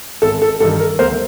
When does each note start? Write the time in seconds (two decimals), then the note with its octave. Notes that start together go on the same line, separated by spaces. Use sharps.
0.22 G#1 A4
0.42 A4
0.60 G2 D#3 A4
0.80 A#4
0.99 D2 A#4 C5